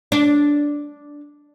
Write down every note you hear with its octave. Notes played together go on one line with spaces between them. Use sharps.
D4